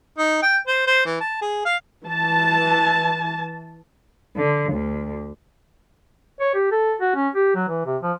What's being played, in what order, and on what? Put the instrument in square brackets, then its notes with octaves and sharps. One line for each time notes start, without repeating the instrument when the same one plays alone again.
[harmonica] D#4
G5
C5
C5
E3
A5
G#4
F5
[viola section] E3 A5
[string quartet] D3
D2
[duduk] C#5
G4
A4
F#4
C#4
G4
F#3
E3
C3
F3